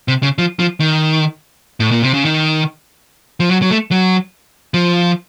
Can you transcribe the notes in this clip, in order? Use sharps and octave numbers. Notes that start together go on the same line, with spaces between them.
C3
C#3
F3
F3
D#3
A2
A#2
C3
C#3
D#3
F3
F#3
F#3
A3
F#3
F3